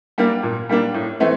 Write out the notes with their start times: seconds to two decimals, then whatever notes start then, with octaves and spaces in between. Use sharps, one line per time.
0.18 G3 A#3 D4
0.43 A#2
0.69 G3 A#3 D4
0.94 A2
1.20 E3 A3 C4